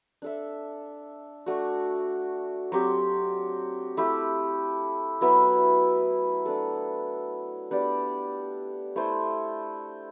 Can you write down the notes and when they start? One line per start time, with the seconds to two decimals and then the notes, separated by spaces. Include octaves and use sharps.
0.22 D4 A4 E5
1.46 A3 D4 F#4
2.72 F#3 C4 G4
3.97 A3 E4 G4
5.21 F#3 B3 E4 B4
6.46 A3 D4 A4
7.71 B3 D4 G4 D5
8.96 A3 E4 A4 C5